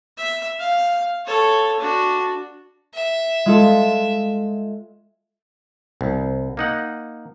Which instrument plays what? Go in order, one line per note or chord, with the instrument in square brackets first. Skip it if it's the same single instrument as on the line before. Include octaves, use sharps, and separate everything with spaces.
[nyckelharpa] E5
F5
A4 C#5
D4 F#4
[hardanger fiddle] E5
[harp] G#3 F4 A4
[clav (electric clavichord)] C2
A#3 D#4 F#5